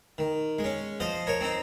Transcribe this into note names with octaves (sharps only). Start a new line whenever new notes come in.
D#3
G#3
C#4
F3 C5 D#5
A#4 C#5
C4 D#4